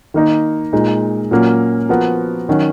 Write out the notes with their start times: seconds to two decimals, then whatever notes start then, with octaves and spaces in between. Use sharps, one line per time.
0.14 D#3 A#3 D#4 A#4
0.73 A#2 G#3 D#4
1.31 A#2 F#3 A#3 C#4
1.89 F3 B3 F#4 A#4
2.49 D#3 F#3 C#4 F#4